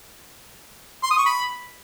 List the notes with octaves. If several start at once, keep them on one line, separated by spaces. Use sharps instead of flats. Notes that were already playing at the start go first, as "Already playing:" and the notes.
C6
D#6
C#6
B5